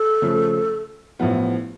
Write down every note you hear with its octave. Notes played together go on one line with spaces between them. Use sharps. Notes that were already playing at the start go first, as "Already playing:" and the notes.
Already playing: A4
C#3 F3 A3
A1 A2 F3 B3 F4